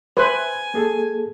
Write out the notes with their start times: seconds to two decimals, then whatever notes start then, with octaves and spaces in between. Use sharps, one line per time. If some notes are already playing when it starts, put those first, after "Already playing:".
0.17 B4 C5 E5 G#5
0.74 A#3 G#4 A4